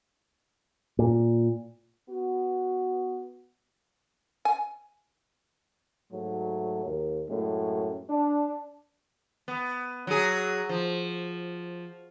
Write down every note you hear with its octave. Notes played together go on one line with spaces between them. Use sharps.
A#2
B3 F#4
G#5
G#2 F#3 A3
D#2
F#2 A2 G#3
D4
B3
F#3 G#4
F3